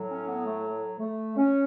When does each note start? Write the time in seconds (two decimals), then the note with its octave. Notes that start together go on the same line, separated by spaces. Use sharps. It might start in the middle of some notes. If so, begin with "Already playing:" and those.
Already playing: A2 F#3
0.09 C#4
0.27 B3
0.45 A3
0.99 A3
1.36 C#4